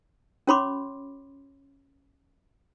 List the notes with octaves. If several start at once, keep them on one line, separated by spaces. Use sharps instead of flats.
C#4 F#4 C#5 B5 C6 D6